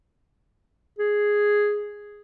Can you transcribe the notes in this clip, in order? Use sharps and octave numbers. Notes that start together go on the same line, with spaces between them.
G#4